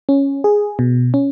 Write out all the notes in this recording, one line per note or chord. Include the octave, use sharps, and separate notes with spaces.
C#4
G#4
B2
C#4